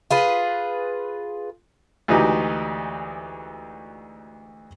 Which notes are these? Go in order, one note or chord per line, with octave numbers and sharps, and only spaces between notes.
F4 G#4 B4
D2 E3 G#3 D#4 F#4 G4